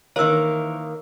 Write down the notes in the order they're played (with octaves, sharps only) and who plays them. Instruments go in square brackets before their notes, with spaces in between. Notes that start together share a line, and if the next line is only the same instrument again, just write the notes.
[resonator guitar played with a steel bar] D#3 A#3 [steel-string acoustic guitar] E3 C4 A#4 [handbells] C#5 E6